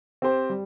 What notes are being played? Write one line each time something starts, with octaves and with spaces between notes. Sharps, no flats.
C4 G4 C5
G3